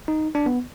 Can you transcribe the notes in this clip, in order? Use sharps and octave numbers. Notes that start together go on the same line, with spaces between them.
D#4
D4
B3